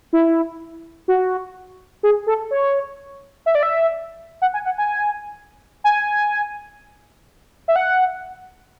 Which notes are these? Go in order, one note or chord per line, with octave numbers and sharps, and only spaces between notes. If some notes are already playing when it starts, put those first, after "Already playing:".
E4
F#4
G#4
A4
C#5
E5
D5
E5
F#5
G#5
F#5
G#5
G#5
E5
F#5